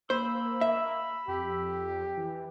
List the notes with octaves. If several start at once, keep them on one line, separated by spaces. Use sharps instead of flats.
A#3 C5 B5 E6
E5
F2 G4
E3